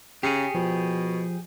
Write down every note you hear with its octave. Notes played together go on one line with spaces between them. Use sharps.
C#3 G4 G#4 C7 C#7
B2 F3